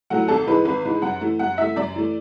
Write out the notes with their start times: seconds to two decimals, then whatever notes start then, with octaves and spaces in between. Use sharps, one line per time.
0.10 A2 F#3 A3 F#5
0.28 G#1 A4
0.47 G#2 E3 G#3 B4
0.65 G#1 B4
0.85 G#2 E3 G#3
1.02 F#2 F#5
1.21 E3 A3
1.39 F#2 F#5
1.58 E3 A3 E5
1.76 F#2 D5
1.96 E3 A3